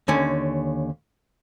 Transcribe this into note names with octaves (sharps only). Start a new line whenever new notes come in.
D#2 D3 C#4